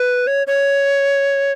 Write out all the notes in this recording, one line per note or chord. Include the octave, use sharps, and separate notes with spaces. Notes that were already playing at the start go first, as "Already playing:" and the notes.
Already playing: B4
C#5
C#5